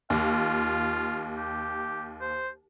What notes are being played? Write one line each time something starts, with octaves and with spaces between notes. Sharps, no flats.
D#2 F5
F4
G4
C5